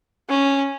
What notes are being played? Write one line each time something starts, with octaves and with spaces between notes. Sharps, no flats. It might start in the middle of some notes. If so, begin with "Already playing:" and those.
C#4